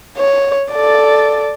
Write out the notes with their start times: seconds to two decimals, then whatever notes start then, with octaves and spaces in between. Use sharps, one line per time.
0.18 C#5
0.72 A4 D5